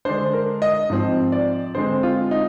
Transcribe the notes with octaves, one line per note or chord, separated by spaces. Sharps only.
D3 G#3 D4 C5
A#4
D#5
G#2 F3 C4
D5
D3 G#3 C4 C5
F4
D#4